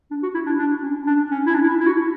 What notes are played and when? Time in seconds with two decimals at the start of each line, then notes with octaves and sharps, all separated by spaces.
0.11 D4
0.23 F#4
0.34 E4
0.47 D4
0.59 D4
0.82 C#4
1.07 D4
1.31 C#4
1.46 E4
1.55 D4
1.70 E4
1.80 E4
1.87 F#4